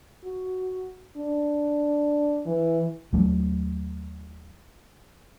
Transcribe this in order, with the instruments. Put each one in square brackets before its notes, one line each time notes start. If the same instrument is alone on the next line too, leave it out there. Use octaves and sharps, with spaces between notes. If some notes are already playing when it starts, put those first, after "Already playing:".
[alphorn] F#4
D4
E3
[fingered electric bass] D#2 F#3 A3